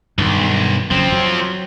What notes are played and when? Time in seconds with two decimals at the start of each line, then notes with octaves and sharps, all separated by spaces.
0.18 B1 G2 D#3
0.91 F#1 F#2 F3 C4
1.12 F#3